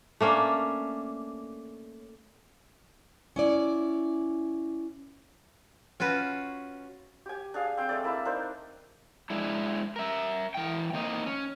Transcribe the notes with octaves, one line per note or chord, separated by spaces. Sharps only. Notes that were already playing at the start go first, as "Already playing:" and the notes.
A3 A#3 C#4 D4
C#4 E4 D5
C#4 F4 F#4 B4
G4 G#5
D4 G#4 F5
C4 G5
G#3 A3 D5
A#3 E4 E6
D4 D#4 A#4 C5
G#3 D4 E4
A#4 E5
E3 G5
D#3 A#3 C4 D#5
C#4